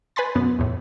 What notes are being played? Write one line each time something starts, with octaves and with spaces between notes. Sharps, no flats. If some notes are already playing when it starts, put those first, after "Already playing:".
B4 G#5 B5 C6 A6
F#2 B2 B3
E2 A2